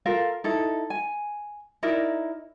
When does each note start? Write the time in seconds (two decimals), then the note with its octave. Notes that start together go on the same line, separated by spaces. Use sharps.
0.06 F4 A4 A#4 F5
0.44 D#4 E4 A4
0.90 G#5
1.83 D#4 E4 A#4 D5